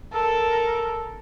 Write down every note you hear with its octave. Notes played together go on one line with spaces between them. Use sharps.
A4 A#4